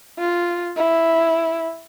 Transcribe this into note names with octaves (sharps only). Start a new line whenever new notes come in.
F4
E4